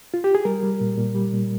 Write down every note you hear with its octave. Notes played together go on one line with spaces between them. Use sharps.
F4
G4
G#4
G3 A#4
G3
A#2
A#2
G3
A#2